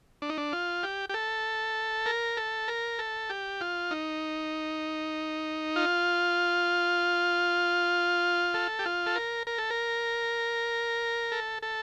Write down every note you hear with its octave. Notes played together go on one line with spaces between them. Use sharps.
D4
D#4
D4
F4
G4
G4
A4
A#4
A4
A#4
A4
G4
F4
D#4
F4
A4
G4
F4
A4
A#4
A#4
A4
A#4
A4
A4